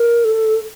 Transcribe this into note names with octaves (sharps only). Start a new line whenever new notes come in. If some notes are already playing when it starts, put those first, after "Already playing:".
Already playing: A#4
A4